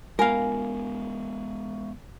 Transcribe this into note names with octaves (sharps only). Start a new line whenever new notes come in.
G#3 B3 F4 A#4 F5 G#5